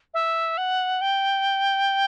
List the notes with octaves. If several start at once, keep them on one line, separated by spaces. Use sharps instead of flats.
E5
F#5
G5